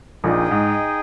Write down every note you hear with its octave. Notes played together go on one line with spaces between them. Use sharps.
A#1 A#2 D#4 G#4 D#5 G5
G#2